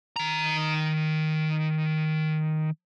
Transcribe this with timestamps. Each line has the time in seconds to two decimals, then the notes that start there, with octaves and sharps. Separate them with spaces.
0.16 D#3 A#5